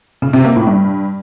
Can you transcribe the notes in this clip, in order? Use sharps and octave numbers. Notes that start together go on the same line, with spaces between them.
C#3
C3
A#3
A2
G2